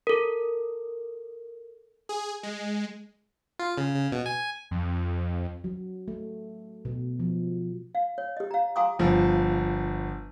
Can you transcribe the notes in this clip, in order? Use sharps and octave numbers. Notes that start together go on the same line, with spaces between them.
A4 A#4
G#4
G#3
F4
C#3
C#3
B2
G#5
F2
F#3
A3
B2
F3
F5
C#5
G4 D#5
F5 A#5
F5 G#5 A#5 C6 D6 D#6
G1 F3